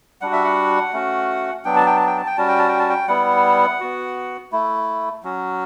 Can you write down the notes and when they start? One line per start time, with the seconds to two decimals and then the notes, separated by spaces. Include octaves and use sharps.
0.21 G3 D4 F#4 F#5
0.33 E5
0.44 F#5
0.93 A3 C#4 F#4
1.65 F#3 B3 D4 G5
1.76 A5
1.86 G5
1.96 A5
2.07 G5
2.17 A5
2.27 G5
2.37 G3 C#4 F#4 A5
2.48 G5
2.58 A5
2.68 G5
2.79 A5
2.89 G5
3.08 G3 B3 E4 F#5
3.80 B3 F#4
4.52 A3 E4
5.23 F#3 C#4 F#4